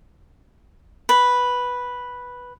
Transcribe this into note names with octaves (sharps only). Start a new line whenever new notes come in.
B4